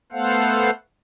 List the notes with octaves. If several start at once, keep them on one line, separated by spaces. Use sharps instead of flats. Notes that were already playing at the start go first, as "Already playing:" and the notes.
A3 B3 A4 C5 F5 F#5